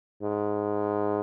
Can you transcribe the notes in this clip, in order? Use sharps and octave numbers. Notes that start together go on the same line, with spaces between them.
G#2